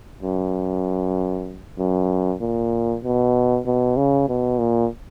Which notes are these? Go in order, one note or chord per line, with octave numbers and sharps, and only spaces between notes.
F#2
F#2
A#2
B2
B2
C#3
B2
A#2